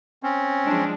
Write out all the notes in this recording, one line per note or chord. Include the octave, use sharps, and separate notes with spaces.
C4 C#4
F3 G#3 D4